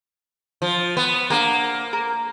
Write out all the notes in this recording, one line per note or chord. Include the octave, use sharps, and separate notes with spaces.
F3
B3
A#3 D4 F#5 A#5
A#4